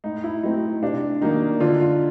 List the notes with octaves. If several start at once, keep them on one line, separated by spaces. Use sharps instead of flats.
A2 D#4
E4
F#3 A3 C4 D#4
C3 D4
D#3 F#3 A#3 D#4
D3 F4
F4